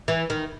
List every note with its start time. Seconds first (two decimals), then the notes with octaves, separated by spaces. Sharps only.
0.08 E3
0.30 D#3